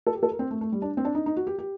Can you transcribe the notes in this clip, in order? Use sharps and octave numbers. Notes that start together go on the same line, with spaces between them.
A4
G4
A4
A#4
C4
A3
A3
G3
D4
C4
D4
D#4
D#4
F#4
G4
G4